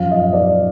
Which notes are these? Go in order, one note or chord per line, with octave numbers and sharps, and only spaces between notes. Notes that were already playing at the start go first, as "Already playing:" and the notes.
Already playing: F#2 F3 F5
D#5
D5